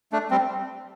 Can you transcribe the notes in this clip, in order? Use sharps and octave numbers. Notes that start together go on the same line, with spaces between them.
A3 D4
G3 C4